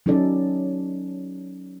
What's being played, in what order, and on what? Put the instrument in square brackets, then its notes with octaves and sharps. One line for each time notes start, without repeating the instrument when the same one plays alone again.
[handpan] F#3 C#4 D#4 A4 D5